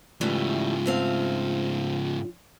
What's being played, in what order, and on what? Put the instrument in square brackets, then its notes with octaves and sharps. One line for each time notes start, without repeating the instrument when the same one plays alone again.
[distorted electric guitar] G#2 C#3 [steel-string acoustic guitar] E3 G3 A3 [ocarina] F4
[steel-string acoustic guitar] A3 C4 F5